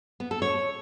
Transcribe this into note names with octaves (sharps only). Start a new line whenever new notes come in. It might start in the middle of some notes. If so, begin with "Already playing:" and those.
B3
A4
C#5